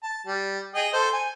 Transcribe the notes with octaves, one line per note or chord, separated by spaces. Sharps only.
A5
G3
G#4 D#5 G5
A4 C5
G#5